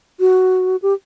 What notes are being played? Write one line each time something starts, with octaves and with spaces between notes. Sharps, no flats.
F#4
G4